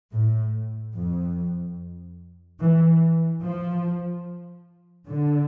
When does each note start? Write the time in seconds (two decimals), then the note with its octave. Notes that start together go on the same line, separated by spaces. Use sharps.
0.14 A2
0.96 F2
2.60 E3
3.43 F3
5.07 D3